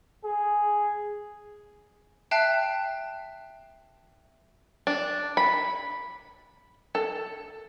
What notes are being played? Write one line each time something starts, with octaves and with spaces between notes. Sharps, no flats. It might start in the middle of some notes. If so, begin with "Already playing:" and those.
G#4
E5 G5 A5 F#6 C7
D4
B5
A4